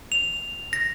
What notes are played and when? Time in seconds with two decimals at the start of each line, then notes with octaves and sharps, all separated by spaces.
0.12 F7
0.73 A#6